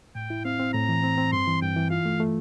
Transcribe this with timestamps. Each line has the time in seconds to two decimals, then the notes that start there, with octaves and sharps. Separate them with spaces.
0.15 A2 G5
0.30 E4
0.45 C4 F5
0.60 C4
0.74 A2 A#5
0.89 E3
1.03 C4
1.18 C4
1.32 G2 C6
1.47 E3
1.62 G2 G5
1.76 E3
1.90 F4 F5
2.05 A3
2.20 A3